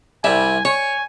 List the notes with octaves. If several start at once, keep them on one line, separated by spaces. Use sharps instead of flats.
C2 G3 E5 G#5
C#5 G#5 C#6